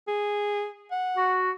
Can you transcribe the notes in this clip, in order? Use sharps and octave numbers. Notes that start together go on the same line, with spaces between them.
G#4
F#5
F#4